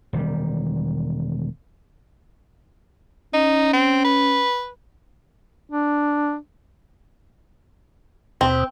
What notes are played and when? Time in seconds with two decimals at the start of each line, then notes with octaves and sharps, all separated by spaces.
0.13 E1 D#3 G3
3.34 C#4 D#4
3.73 C4
4.04 B4
5.70 D4
8.41 D#2 B2 C4